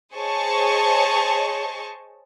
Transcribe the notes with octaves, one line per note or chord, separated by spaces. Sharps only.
G#4 C5 C#5 D#5 A5 C#6